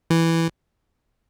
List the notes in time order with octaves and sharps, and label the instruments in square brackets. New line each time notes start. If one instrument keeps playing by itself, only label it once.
[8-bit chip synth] E3